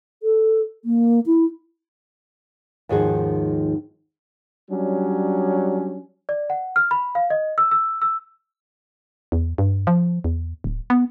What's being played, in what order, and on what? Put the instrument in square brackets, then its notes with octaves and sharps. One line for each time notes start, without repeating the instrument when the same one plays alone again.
[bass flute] A4
A#3
E4
[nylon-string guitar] D#2 G#2 D#3 F3 F#4 G#4
[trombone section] F#3 G3 C#4 D4
[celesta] D5
F#5
F6
B5
F5
D#5
E6
E6
E6
[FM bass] E2
G2
F3
E2
D1
B3